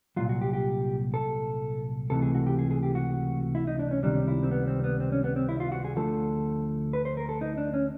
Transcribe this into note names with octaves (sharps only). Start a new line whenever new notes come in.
C2 A#2 F#3 F4
F#4
G4
G4
A4
C#2 C3 E3 A3 A4
G#4
F#4
G4
G#4
G#4
G4
F#4
E4
D#4
D4
C#4
C#2 C3 D#3 G3 D4
E4
C4
B3
C4
B3
C4
C#4
B3
C4
E4
F4
F#4
G#4
D2 D3 F3 A3 A4
B4
C5
A#4
A4
D#4
D4
C#4